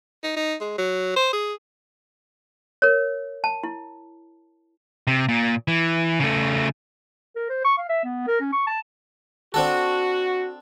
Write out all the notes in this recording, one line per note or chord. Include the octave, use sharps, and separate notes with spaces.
D#4
D#4
G#3
F#3
C5
G#4
A#4 C#5
A5
E4
C3
A#2
E3
C#3 A3
A#4
C5
C#6
F5
E5
B3
A#4
C#4
C#6
A5
C4 D4 F#4 A4